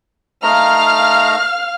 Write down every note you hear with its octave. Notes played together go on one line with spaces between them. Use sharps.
A3 D#4 F5 A#5 F6